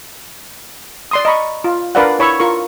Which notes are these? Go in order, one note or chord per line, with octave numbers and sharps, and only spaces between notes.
D5 C6 D#6
D#5 A#5 B5 C#6
F4
D4 A#4 B4 D5 F5 F#5
E4 C#5 B5 C#6 E6
F4 A#4 C#6